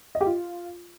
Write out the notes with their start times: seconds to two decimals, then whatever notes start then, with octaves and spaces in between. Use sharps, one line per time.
0.15 D#5
0.21 G4
0.26 F4